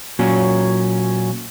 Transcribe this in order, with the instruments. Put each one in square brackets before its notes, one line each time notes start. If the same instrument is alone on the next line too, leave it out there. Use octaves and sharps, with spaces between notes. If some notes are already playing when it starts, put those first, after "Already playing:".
[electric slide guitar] A#2 F#3 C#4